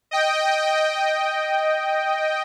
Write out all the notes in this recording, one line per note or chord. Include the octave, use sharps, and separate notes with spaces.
D#5 G5